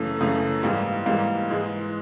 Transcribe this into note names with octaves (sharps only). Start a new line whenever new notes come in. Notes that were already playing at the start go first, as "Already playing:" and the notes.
Already playing: F#2 C#3 E3 A3
F#2 C#3 E3 A3
G#2 E3 G3 A#3
G#2 E3 G3 A#3
G#2 E3 G#3